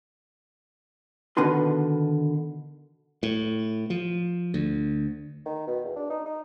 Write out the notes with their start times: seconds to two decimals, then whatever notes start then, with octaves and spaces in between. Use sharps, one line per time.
1.37 B2 D3 D#3 B4 C6
3.23 A2
3.90 F3
4.54 D2
5.46 D#3
5.67 B2
5.84 E2
5.96 D4
6.10 D#4
6.26 D#4